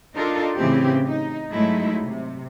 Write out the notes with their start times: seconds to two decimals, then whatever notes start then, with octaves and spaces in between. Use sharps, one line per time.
0.15 D4 D#4 F4 A4 A#4
0.58 A2 C#3 E3 C4 G4
1.08 D#4
1.51 G#2 F#3 G#3 A3 D#4 E4
2.03 C3